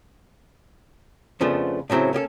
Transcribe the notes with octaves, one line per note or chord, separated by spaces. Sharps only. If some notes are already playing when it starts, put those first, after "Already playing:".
F2 C#3 F3 A3 B3 D4
A2 C#3 F#3 C4 E4
A#3 C#4 G4 A4